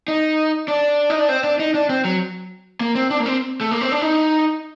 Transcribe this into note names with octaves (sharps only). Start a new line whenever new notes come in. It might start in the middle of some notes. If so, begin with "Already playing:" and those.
D#4
D4
D#4
D4
C4
D4
D#4
D4
C4
F#3
A#3
C4
D4
A#3
C4
A3
A#3
C4
D4
D#4